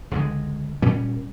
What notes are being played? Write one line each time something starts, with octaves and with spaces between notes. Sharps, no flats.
C#2 D3 F#3 G#3
A#2 G3 C#4